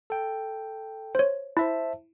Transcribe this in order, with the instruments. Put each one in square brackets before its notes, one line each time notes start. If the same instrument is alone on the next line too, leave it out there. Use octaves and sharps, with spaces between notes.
[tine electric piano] A4 G5
[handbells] C5 C#5
[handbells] E4 [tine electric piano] C5 E5 A5